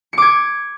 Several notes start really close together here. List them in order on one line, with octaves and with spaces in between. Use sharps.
C#7 D6 G#6